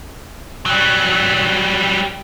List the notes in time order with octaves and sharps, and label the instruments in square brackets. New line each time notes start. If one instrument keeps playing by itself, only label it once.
[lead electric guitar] F#3 G3